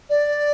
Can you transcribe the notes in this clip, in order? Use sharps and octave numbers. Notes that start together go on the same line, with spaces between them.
D5